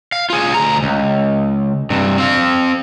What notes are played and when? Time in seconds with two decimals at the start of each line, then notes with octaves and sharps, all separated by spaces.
0.12 F5
0.30 F4 G#4
0.54 D2 A#5
0.83 C#2
1.90 G2 C3
2.18 C4 F5